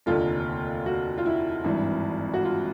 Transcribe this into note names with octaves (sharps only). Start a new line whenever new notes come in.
F1 D#2 D3 F4
F#4
F4
E4
G#1 G2 E3
F#4
F4